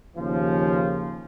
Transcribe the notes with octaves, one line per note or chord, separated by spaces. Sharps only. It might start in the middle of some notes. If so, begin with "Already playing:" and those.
D#2 C#3 F3